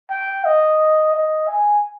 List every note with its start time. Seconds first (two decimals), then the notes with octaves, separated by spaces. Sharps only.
0.10 G5
0.45 D#5
1.13 D#5
1.47 G#5